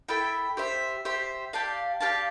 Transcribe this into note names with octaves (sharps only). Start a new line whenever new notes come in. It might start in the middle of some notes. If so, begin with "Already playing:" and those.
E4 A4 E5 G5
G4 C5 E5
G4 C5 E5
G4 D5 F5 A5
G4 D5 F5 A5